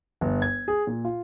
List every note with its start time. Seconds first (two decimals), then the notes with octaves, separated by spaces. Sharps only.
0.21 G1
0.42 G#6
0.68 G#4
0.87 A#2
1.05 F4